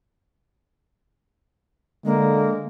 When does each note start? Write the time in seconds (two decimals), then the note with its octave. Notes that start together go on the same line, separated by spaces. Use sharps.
2.05 D3 G#3 A#3